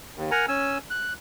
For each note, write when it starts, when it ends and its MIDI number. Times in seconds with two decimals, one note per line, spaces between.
0.16 0.31 39
0.31 0.46 70
0.31 0.46 78
0.31 0.46 80
0.31 0.46 82
0.48 0.78 61
0.48 0.78 80
0.48 0.78 88
0.90 1.13 90